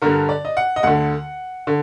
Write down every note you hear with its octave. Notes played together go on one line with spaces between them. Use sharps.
G2 D3 A#4
D5
D#5
F#5
D#5
D2 D3 F#5
D3